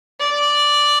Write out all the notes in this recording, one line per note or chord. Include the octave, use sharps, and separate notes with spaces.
D5